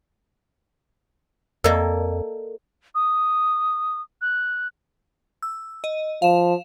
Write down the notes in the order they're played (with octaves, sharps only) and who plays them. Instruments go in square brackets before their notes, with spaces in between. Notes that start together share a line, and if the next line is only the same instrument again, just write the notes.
[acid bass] F2 [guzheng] A#3 A4 [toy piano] A#4 D5 D#5
[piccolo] D#6
F#6
[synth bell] E6
D#5
[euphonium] F3 [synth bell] F5 E7